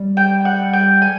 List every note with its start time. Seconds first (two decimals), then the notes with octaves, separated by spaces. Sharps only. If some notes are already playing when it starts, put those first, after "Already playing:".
Already playing: G3
0.17 G5
0.45 F#5
0.73 G5
1.02 G#5